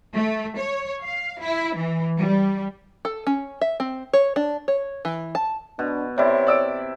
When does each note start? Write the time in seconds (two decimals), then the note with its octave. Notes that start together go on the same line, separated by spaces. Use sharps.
0.13 A3
0.57 C#5
1.03 F5
1.42 E4
1.76 E3
2.18 G3
3.05 A4
3.27 C#4
3.61 E5
3.80 C4
4.13 C#5
4.36 D4
4.68 C#5
5.05 E3
5.35 A5
5.79 B2 D4
6.18 C3 E4 C#5 D5
6.47 D5 E6 D7